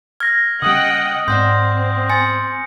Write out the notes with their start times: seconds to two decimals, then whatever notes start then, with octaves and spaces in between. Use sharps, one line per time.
0.20 F6 G#6 A#6
0.62 C#3 G3 D#5 F#5 G5 D#6
1.28 G#2 C4 D5 F#5 C6 G6
2.10 G#5 C6 A6 C#7